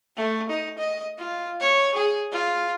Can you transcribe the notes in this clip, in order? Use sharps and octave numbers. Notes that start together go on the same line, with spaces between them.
A3
D#4
D#5
F4
C#5
G#4
F4